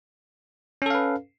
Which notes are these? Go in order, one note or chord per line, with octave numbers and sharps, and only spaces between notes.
C#4 A4 B4 F5